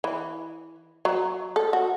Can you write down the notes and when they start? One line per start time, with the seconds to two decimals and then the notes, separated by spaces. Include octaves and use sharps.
0.04 E3
1.05 F#3
1.56 A4
1.73 F#4